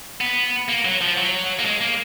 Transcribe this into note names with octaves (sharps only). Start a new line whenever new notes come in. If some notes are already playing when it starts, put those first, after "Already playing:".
B3
A#3
F#3
F3
F#3
A#3
G#3
A#3